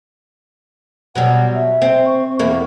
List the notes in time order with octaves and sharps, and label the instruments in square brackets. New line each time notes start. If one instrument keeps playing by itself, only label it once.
[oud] B2 F#3 G3 [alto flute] F#5
[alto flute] E5
[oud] C4
[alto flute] C#6
[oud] E2 A#3 [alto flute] E5